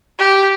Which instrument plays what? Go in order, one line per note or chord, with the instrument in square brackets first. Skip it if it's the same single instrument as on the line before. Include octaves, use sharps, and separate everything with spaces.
[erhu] G4